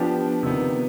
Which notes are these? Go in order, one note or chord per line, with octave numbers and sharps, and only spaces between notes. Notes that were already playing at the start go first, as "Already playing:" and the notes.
Already playing: F3 B3 D4 G4
C3 D#3 B3